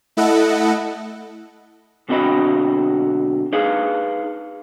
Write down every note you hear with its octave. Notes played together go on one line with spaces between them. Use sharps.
A3 E4 A4 D#5 F#5
B1 D3 C4 F#4 D#5 B5
D#4 G#4 B4 F5